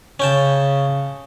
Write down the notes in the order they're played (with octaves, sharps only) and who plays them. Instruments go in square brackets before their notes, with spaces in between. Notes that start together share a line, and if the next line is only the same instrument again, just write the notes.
[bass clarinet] C#3 [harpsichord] C#4 G5 A5